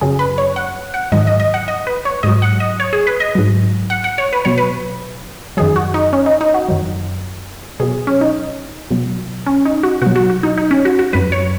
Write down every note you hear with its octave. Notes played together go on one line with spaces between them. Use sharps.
F#2 C#3 F#3 G#4
B4
C#5
F#5
F#5
G#2 D#3 F#3 D#5
D#5
D#5
F#5
D#5
B4
C#5
G#2 F#3 D#5
F#5
D#5
C#5
G#4
B4
D#5
G#2 F#3
F#5
F#5
C#5
B4
B2 F#3 C#5
B4
F#2 D#3 F#3 G#4
F#4
D#4
C#4
D#4
D#4
F#4
F#2 D#3 F#3
B2 F#3 G#4
C#4
D#4
B2 F#3
C#4
D#4
F#4
B2 F#3 F#4
F#4
F#4
D#4
D#4
C#4
F#4
F#4
F#2 F#3 B4
C#5